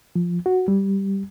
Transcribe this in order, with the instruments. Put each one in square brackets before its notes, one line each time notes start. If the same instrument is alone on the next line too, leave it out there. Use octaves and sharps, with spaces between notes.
[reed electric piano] F3
F#4
G3